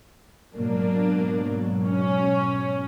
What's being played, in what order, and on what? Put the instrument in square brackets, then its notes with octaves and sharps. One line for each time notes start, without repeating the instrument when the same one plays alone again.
[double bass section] G#2 B2 F#3 [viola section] A#3 D4
[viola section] C#4